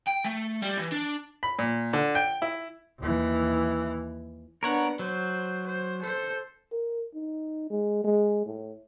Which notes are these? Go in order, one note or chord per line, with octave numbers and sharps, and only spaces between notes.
G5
A3
G3
E3
D4
B5
A#2
D3
G5
E4
D#2 E3
B3 D4 A#4 C#5 F#5
F#3 C5
C5
A4 C5
A#4
D#4
G#3
G#3
A2